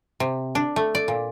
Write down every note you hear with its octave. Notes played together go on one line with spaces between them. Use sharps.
C3
D4
A3
D5
A#2